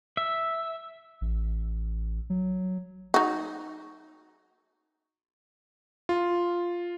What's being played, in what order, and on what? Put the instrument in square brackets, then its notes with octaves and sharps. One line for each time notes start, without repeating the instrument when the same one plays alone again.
[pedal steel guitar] E5
[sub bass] A1
F#3
[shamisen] D#4 F#4
[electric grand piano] F4